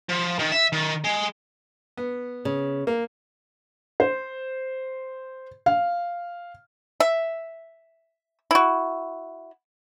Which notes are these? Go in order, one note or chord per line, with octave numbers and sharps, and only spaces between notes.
F3
D#3
E5
D#3
G#3
B3
C#3
A#3
C5
F5
E5
E4 F#4